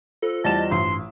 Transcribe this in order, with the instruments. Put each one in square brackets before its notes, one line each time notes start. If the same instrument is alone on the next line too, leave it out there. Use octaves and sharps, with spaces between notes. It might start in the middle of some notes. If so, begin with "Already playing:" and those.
[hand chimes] F4 C5 [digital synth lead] A4
[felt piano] E2 G3 E7 [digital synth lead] D#5 [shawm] A5
[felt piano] A1 [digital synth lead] G2 [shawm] C6